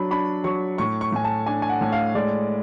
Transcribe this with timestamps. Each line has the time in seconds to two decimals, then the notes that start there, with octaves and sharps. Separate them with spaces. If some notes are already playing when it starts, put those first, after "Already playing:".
Already playing: F#3 D4 B5
0.11 D4 B5
0.44 F#3 C#6
0.78 A2 C#6
1.01 C#6
1.12 A2 G#5
1.24 A5
1.46 D4 G#5
1.62 G#5
1.69 F#5
1.81 A2
1.92 F5
2.15 G#3 D5